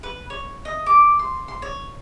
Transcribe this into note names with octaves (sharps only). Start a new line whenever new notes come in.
B4
C#5
D#5
D6
C6
C6
C#5